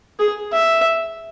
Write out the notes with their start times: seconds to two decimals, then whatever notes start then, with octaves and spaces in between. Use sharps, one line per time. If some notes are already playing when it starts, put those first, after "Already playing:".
0.19 G#4
0.52 E5